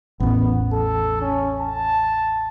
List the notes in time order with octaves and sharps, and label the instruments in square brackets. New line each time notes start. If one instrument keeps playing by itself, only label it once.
[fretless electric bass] A1 E2 [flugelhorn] B3
[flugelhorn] A4
C#4
A5